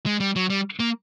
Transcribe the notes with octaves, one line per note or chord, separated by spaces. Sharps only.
G#3
G3
F#3
G3
A#3